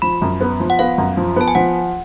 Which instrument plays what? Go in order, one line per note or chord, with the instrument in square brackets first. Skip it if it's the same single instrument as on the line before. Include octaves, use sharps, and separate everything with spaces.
[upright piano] F3 [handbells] B5
[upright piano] F#2
B3
F3
[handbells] F#5
[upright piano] B3 [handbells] F5
[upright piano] F#2
F3
[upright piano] B3 [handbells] A5
[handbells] G#5
[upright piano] F3 [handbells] F#5